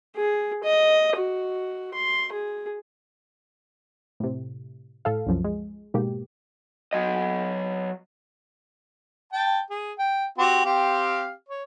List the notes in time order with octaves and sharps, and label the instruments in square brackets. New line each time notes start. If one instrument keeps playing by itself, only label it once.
[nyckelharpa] G#4
D#5
F#4
C6
G#4
[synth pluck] A2 C3
A2 A4 F5
C2 F#2 F3
G#3
G#2 B2 A#3 G4
[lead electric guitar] F#3 D#5
[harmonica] G5 A5
G#4
G5
C4 F#4 G4
C4 G4 F5
C#5